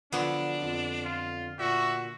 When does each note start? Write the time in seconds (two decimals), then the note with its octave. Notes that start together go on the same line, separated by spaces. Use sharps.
0.12 D3 F3 F#3 B3 D4
0.62 F2
1.05 F4
1.59 A#2 F#4 E5